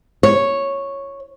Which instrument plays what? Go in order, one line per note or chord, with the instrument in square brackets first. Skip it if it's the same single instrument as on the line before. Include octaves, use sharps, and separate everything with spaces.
[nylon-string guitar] C#5